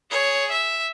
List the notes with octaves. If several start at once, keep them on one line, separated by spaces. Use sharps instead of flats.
G#4 C#5
E5